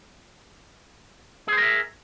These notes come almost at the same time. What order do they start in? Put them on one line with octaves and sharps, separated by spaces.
G#4 C5 A#4 E5